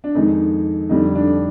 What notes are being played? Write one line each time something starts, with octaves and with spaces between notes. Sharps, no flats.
D4
F2 D#3 G#3 D#4
F2 D3 G3 D#4
D4